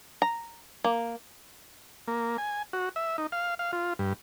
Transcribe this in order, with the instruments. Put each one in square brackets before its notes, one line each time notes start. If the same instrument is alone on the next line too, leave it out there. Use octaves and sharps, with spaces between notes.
[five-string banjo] A#5
A#3
[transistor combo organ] A#3
G#5
F#4
E5
D#4
F5
F5
F4
G2